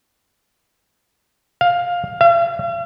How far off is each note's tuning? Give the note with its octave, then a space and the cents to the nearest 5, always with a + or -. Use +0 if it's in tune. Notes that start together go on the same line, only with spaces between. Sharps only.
F5 +10
F5 -45